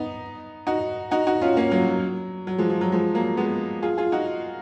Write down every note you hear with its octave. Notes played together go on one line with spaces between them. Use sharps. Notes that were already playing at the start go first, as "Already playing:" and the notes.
Already playing: B3 D#4
D#4 F#4
D#4 F#4
D#4 F#4
C#4 F4
A#3 C#4
F#3 A#3
F#3
F#3
F3 G#3
F3
F#3
F3 G#3
F#3 A#3
G#3 B3
F4 G#4
F4 G#4
D#4 F#4